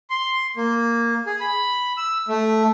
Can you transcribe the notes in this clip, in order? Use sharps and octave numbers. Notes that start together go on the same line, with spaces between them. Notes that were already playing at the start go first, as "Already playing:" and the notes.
C6
A#3
G#4
B5
E6
A3